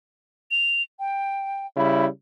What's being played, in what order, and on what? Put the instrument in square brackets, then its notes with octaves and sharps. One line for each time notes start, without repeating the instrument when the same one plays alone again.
[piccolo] F7
G5
[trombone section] C#3 G3 E4 [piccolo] B5